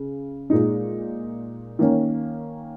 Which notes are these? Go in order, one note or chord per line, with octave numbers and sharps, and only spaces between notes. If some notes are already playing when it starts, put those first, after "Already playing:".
Already playing: C#3
A#2 G#3 D#4
D#3 A#3 C#4